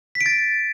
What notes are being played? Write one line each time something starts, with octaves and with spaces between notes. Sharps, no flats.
B6
D7
A6